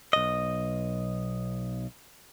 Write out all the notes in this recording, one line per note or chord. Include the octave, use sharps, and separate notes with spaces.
B1 D#5